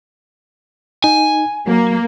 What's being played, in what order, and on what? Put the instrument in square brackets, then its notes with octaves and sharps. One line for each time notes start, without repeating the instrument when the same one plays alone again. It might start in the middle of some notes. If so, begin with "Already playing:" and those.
[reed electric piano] D#4 [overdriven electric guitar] G#5
[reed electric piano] F#3 [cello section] A#3